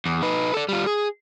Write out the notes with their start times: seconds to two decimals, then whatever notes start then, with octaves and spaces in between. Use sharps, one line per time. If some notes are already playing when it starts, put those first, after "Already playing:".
0.06 E2
0.22 D#4 B4
0.54 A4 D5
0.69 G3 F4
0.86 G#4